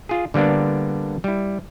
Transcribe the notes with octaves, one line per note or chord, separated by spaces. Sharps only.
F4 G#4
D3 G3 A#3 B3 D4
G3 E4